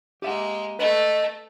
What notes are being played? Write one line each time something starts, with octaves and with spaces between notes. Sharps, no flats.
G#3 A#3 G4 E5 F#5
A3 B4 D#5